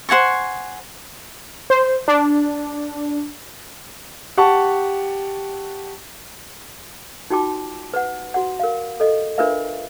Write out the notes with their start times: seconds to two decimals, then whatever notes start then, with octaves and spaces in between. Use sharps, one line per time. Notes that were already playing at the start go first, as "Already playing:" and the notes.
0.09 C5 F#5 G#5 C#6
1.70 C5
2.08 D4
4.37 G4 F#5 A5 C#6
7.30 D#4 F4 F#4 G5 A5 D6
7.94 B4 F#5
8.34 F#4 F#5
8.60 A#4 F5
9.00 A4 D#5
9.38 D4 F4 A#4 B4 E5 F5